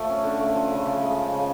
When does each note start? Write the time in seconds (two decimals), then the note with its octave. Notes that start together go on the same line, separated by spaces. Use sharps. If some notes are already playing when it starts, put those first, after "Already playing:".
Already playing: F3 A3
0.10 C#4
0.24 D3
0.40 A3
0.55 F3
0.70 C#3
0.86 C#3
1.01 G#3
1.17 F3
1.32 C#3